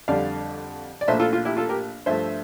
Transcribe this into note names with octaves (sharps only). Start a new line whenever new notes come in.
F2 D3 G3 D5 F5
D5
A#1 A#2 A3 C5 E5
F4 A4
F4
E4 G4
F4 A4
G4 A#4
G2 F3 A3 C5 E5